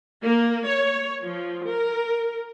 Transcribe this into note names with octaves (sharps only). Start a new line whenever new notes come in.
A#3
C#5
F3
A#4